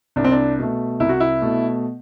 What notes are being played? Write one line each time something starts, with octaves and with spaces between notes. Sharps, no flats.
C2 D4
C4
D4
B2 A3
C2 E4
F#4
E4
B2 A3